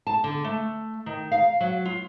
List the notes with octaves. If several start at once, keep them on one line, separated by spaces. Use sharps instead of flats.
A5
D3
A3
D#3
F5
F#3
F4